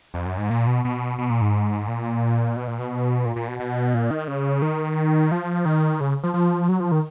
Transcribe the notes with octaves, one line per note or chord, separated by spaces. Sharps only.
F2
F#2
G#2
A#2
B2
B2
B2
A#2
G#2
A#2
B2
A#2
B2
A#2
A#2
B2
B2
A#2
D#3
C#3
D#3
F3
D#3
C#3
F3
F3
F#3
F3
D#3